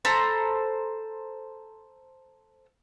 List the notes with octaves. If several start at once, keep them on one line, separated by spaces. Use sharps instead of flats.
A4 C5 A#5 B5